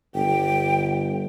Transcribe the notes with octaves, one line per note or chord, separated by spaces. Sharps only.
G1 G5